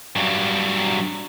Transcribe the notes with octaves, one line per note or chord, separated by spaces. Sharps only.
G2 F#3